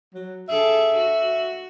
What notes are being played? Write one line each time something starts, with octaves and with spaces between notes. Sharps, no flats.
F#3
D4 G#4 A4 E5
F#4